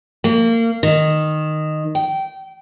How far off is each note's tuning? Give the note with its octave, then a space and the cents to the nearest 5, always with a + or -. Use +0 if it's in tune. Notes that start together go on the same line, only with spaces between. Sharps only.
A#3 -30
D#3 -10
G5 -20